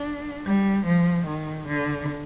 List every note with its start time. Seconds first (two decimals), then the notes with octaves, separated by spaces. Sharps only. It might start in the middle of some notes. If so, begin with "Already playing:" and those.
Already playing: D4
0.45 G3
0.86 F3
1.27 D#3
1.68 D3